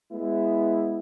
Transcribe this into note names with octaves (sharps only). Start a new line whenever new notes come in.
G#3 B3 E4